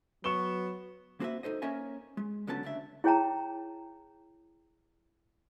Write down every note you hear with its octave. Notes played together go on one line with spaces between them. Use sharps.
F#3 B3 C#6 E7 G7
A#3 C4 F#4 A4 B4 E5
D#4 A4 C5 D#5
A#3 C#4 A#4 D#5 E5 G#5
G#3
C#2 D3 F#3 B3 C#4 A5
D2 C#3 D4 E5
E4 G#4 C#5 G5 A5 A#5